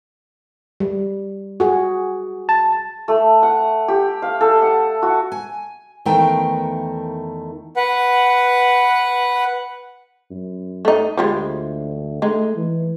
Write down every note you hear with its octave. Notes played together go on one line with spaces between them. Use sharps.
G3
F#4 G#4
A5
A3
F#5
G4
F5
A4
F#5
F#4
G#5
E2 D#3 A3 A#4 G5
B4 F#5
F#2
A3 D#4
D2 F3 G3 G#3
G#3 A3 D#4
E3